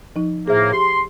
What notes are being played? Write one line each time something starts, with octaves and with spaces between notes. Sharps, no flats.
F3 D#4
A2 A#3 G#4 C5 E5
G4 C6